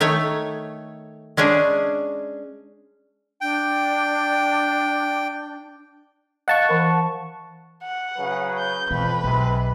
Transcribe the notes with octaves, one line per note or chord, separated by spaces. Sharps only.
D#3 A3 C#5
G#3 C#4 D4 G#4
D4 G5
D#5 F5 F#5 A5 C#6
E3 A#4
F#5
C#3 F#3 B4
G6
F2 B2 E3 B4
B1 C3 E3 G#3